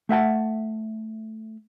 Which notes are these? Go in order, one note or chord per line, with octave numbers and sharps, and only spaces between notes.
A3 E5 F#5 A5